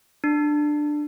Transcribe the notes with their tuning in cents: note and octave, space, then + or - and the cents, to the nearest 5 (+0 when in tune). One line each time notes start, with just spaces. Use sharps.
D4 +15